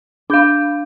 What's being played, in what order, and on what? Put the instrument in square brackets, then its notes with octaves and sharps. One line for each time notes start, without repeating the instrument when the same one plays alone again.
[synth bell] D4 F5 [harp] D6 G6 A#6